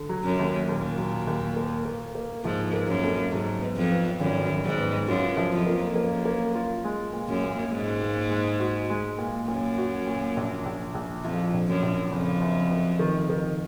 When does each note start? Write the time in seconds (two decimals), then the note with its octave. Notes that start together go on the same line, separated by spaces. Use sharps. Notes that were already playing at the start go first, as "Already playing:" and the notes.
Already playing: D3
0.09 F#3
0.24 F#2
0.39 D#2
0.68 D#2 A#2
0.98 F#3
1.27 D#2
1.56 A#3
1.85 A#3
2.15 A#3
2.44 G#2 F3
2.73 A#3
2.88 F#2
3.03 F2
3.32 G#2 F#3
3.61 B3
3.76 F2
3.90 B3
4.19 G#1 F#2
4.50 G#1
4.64 G#2
4.78 B3
5.07 F#2 F4
5.37 F3
5.52 F2
5.66 A#3
5.95 F#2 A#3
6.25 A#3
6.55 F4
6.84 G#3
7.13 A#2
7.28 F#2
7.43 A#2
7.71 G#2 G#3
8.01 A#2
8.30 G#3
8.60 F#4
8.90 G#3
9.18 A#2
9.48 F#2 A#2
9.78 F#4
10.07 A#2
10.36 A#1
10.65 A#1
10.94 A#1
11.24 F2 F3
11.53 A#1
11.68 F#2
11.82 A#1
12.11 F#1 F2
12.41 F#2
12.71 F#2
12.99 D#3
13.29 D#3